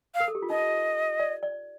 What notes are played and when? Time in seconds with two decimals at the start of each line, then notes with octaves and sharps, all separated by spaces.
0.15 F5
0.20 A#4
0.28 A4
0.35 G4
0.42 F4
0.50 D#4 D#5
1.20 D5
1.43 D5